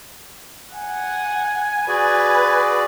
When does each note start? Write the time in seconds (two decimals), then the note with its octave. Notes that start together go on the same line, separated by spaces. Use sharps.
0.75 F#5 G#5
1.88 F#4 G#4 B4 D5